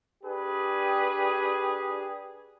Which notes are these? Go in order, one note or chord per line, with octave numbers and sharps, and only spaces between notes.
D4 G4 G#4 B4